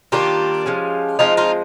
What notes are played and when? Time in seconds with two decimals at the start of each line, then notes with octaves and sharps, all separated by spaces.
0.12 D#3 G3 A#3 D4 F4 G4
0.66 F3 G#3 C#4
1.19 F3 G#3 C4 D#4 F4
1.37 D#4 F4